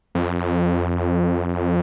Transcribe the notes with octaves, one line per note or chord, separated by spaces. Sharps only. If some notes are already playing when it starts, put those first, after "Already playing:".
F2